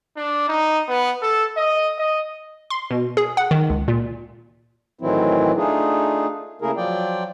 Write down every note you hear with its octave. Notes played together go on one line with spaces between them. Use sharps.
D4
D#4
B3
A4
D#5
D#5
C6
B2
G#4
F#5
D#3
C#2
A#2
A2 D#3 E3 F#3 C4 E4
A3 D4 D#4 F4 G#4
C#3 A3 A#3 E4 G#4 A#4
F3 F#3 F4 D5 G5